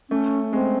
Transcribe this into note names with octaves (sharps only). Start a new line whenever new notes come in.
A3 C#4
G#3 C4